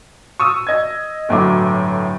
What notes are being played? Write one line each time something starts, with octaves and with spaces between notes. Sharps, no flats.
C#6 D#6 E6
D#5 G#6
G1 A2 F#3 D6